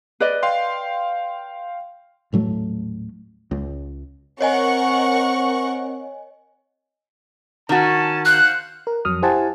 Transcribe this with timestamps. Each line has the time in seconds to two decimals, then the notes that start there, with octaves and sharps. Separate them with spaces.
0.20 B4 D5 D#5
0.43 F5 G5 C6
2.32 D#1 A2 F#3 A3
3.51 C#2
4.41 C4 A#4 C#5 D#5 F#5 G#5 C#6
7.69 D#3 C#4 F#4 A5
8.25 C5 F5 F#5 F#6
8.87 A#4
9.05 F2 F#3 D#6 F6
9.22 E4 G4 C5 F#5 G#5 A5